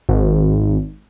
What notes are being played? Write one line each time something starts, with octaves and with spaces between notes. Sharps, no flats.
G#1